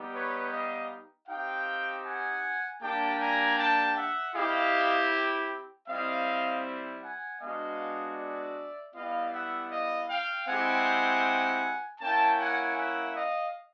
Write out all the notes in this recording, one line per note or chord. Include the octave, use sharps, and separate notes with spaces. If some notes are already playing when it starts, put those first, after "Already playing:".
Already playing: G3 B3 D#4 G4
B4 C#5
D#5 F5
C4 D#4 G4 F5 G5
F#5 G#5
G3 A#3 D4 G4 G5 A5
G#5 A#5
G5 A5
E5 F#5
C4 E4 G4 D#5 F5
G3 C4 E4 D#5 F5
F#5 G#5
G#3 B3 D4 F#4 D#5 F5
D5 E5
G3 B3 E4 D#5 F5
E5 F#5
D#5 F5
F5 G5
G#3 C4 E4 G4 F#5 G#5
A#3 C#4 E4 G5 A5
F#5 G#5
E5 F#5
D#5 F5